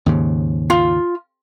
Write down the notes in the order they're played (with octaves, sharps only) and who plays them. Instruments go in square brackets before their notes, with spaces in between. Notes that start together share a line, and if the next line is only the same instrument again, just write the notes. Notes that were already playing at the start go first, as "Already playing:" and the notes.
[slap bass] D#2 G#2 C#3
[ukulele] F4